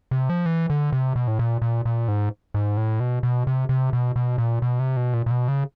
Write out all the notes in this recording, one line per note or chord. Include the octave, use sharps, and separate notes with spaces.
C3
F3
E3
D3
C3
B2
A2
A#2
A#2
A#2
G#2
G#2
A2
B2
B2
C3
C3
B2
B2
A#2
B2
C3
B2
A#2
A#2
B2
C#3